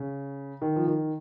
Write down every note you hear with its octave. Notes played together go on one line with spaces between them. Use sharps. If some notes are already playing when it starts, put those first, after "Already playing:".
Already playing: C#3
D#3
F3
D#3